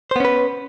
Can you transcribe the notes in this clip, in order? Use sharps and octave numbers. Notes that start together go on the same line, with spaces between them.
B3 C#4 B4 C5